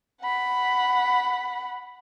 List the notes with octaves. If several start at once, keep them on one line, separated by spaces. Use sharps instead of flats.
F#5 B5